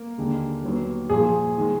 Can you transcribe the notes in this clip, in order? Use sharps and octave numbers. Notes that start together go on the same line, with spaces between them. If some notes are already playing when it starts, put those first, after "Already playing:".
Already playing: A#3 A#4
D#2 D3 G#3
D#2 D#3 F#3 B3
A#2 F3 A#3 G#4
D#3 G#3